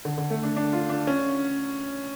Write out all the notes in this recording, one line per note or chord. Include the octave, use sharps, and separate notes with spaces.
D3
D3
A3
D4
D4
F4
D4
C#4